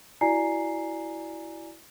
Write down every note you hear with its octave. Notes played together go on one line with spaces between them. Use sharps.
E4 F#4 D5 G#5 A#5 C7